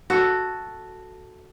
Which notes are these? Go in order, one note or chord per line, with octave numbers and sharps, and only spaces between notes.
F#4 A4